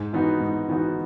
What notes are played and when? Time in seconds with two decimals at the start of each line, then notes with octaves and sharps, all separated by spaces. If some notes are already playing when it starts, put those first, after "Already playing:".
Already playing: G#2
0.13 E3 B3 D#4 F#4
0.41 G#2
0.69 E3 B3 D#4 F#4